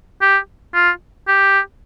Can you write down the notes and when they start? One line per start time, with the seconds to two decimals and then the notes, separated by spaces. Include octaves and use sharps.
0.21 G4
0.74 F4
1.28 G4